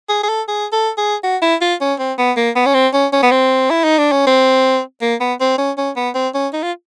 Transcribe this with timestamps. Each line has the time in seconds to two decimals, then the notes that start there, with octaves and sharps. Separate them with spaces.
0.09 G#4
0.23 G#4
0.29 A4
0.48 G#4
0.72 A4
0.98 G#4
1.23 F#4
1.42 E4
1.61 F4
1.81 C#4
1.99 C4
2.18 B3
2.37 A#3
2.56 B3
2.66 C#4
2.74 C4
2.93 C#4
3.13 C#4
3.23 B3
3.32 C4
3.70 E4
3.84 D#4
3.98 D4
4.12 C#4
4.27 C4
5.02 A#3
5.20 B3
5.40 C4
5.58 C#4
5.78 C#4
5.96 B3
6.15 C4
6.34 C#4
6.53 D#4
6.63 F4